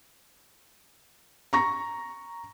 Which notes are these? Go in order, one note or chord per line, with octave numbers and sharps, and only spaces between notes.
A#5 C#6 A#6